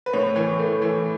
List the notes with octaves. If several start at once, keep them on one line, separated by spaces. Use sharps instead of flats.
B4
A2 C#5
E3
A3
E3